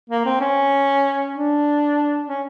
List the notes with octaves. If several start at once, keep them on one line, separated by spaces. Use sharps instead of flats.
A#3
C4
C#4
D4
C#4